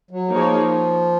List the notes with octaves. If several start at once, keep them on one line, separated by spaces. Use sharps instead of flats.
F#3
F3 A#3 D#4 G#4 C#5